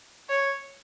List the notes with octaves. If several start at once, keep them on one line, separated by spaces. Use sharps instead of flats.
C#5